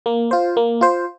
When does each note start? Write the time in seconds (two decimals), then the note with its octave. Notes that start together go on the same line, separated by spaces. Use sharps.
0.06 A#3
0.31 F4 C5
0.57 A#3
0.81 F4 C5